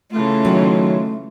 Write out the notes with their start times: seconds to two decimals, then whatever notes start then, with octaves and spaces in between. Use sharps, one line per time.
0.11 C#3 E3 A3 F4
0.45 D#3 F#3